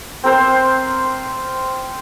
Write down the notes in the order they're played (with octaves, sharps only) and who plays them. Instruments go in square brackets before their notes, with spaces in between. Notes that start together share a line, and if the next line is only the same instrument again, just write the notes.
[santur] C4 A#4 C5